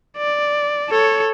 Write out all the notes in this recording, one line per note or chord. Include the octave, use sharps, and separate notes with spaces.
D5
A4 C#5